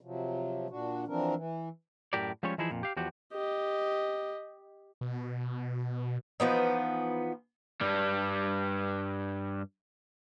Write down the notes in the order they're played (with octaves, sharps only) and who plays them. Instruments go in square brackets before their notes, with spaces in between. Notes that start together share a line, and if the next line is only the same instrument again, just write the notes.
[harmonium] C3 F3 F#3
A#2 D4 F#4
E3 F3 C4 D4 A#4
E3
[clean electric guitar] F#2 A2 G4 A#4 D5
F3 G3 G#3 C#4 C#5
E3 F3 D#4 E4 G#4
F2 A#2
G4 F5
E2 F3 F#4 G4
[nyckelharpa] G4 D#5
[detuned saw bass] B2
[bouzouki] E3 F3 B3 D#4
[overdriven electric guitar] G2 G3